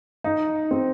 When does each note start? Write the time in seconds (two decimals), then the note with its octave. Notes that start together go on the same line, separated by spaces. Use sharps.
0.24 D#4
0.71 C4